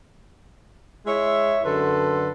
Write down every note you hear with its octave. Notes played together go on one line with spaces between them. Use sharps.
G#3 E4 C#5 E5
F#2 D3 A4 B4 C6